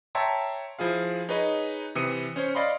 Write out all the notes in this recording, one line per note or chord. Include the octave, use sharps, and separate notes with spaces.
C#5 E5 G5 A5 A#5 C6
F3 E4 G#4 F5
D#4 G#4 B4 C#5 D#5
C3 E3 D#6 C#7 D#7
C#4 C5 C#5
D5 D#5 F5 B5 C6